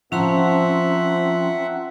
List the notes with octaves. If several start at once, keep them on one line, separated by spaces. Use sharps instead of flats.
F3 C4 C#4 E5 F#5 A#5 C6